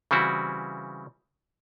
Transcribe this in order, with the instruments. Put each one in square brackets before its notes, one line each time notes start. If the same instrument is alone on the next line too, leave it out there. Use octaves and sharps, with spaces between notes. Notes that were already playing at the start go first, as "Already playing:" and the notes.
[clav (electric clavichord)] C#3 E3 G3 C4 E4 F#4